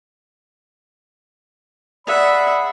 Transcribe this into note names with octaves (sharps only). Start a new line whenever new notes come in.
G#4 D5 E5 F#5 B5